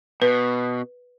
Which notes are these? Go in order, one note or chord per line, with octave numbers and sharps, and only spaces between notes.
B2 B4